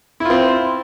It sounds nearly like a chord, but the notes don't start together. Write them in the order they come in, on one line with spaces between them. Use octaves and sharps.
E4 F4 C4